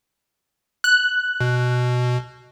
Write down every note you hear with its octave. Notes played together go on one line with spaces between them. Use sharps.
F#6
B2